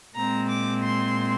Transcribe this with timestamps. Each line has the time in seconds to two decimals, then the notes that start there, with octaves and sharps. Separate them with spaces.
0.15 A#2 G#3 C4 A#5
0.49 D6
0.83 C6